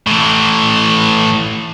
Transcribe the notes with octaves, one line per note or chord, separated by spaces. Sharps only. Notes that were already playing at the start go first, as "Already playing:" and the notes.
A2 E3